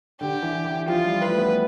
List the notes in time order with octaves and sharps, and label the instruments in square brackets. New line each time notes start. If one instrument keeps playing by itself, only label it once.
[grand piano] D3 [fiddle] G4
[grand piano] E3
E3
[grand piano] F3 [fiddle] F4
[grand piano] G3
[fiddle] B4
[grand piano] A3
B3